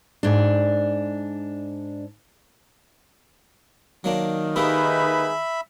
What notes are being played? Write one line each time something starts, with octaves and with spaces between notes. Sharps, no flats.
G#2 D4
D#3 F#3 A#3 D4
A#3 D#4 E4 G4 G#4 B4 E5 B5